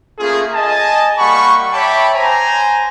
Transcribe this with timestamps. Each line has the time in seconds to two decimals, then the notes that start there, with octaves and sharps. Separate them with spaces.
0.19 A3 A#3 C#4 F4 G#4
0.53 D#5 G#5 A5
1.18 G3 A#3 F#5 B5 C#6
1.72 C#5 E5 G5 A5 B5 D6
2.14 C5 G#5 A#5